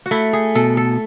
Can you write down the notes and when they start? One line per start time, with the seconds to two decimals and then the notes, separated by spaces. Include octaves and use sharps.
0.06 F#4
0.11 A3 E4
0.33 G#4
0.55 B2 A4
0.77 A4